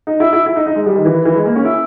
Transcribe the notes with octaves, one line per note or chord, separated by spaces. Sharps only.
D#4
E4
E4
E4
D#4
D#4
G#3
G3
D#3
E3
E3
G#3
A#3
C#4
E4